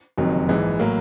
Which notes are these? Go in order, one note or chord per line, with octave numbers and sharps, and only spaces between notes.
F#1 F2 C3 D#3 F#3
A#1 G#2 E3 G#3
A2 F#3 A#3